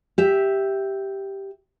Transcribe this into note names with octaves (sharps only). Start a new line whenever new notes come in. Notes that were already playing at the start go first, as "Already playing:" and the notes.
G4 E5